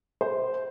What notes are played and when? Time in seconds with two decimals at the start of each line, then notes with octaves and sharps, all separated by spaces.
0.21 C5